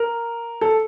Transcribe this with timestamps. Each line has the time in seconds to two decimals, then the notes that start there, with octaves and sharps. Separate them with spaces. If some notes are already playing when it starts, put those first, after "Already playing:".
Already playing: A#4
0.61 A4